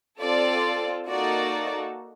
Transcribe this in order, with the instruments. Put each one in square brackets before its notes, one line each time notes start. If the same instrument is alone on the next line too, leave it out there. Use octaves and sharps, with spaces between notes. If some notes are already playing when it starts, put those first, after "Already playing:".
[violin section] C4 F4 A4 D5
A#3 D#4 F#4 A4 D5